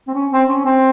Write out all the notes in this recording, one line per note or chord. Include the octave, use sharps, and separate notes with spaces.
C4
C#4
C4
C#4
C4